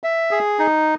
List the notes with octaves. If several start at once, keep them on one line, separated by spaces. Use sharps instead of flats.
E5
G#4
D#4